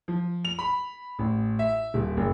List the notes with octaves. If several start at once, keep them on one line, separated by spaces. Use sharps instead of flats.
F3
F7
B5
A1
E5
D#1
F#1